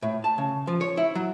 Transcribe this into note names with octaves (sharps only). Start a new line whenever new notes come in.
A2
A5
C#3
F3
C#5
E4
F#3